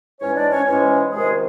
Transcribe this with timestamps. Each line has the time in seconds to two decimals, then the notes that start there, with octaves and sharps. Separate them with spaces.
0.20 G#2 E3 G#3 C#4 C#5
0.35 D4 D5
0.51 C#4 C#5
0.66 G#2 E3 G#3 C#4 C#5
1.12 C#2 C3 D#3 G#3 G#4